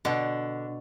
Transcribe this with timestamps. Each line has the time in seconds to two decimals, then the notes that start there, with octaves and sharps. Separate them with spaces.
0.05 B2 D3